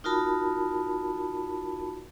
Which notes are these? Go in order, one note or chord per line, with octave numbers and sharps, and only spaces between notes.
D#4 F4 F#4 A#4 A5 B5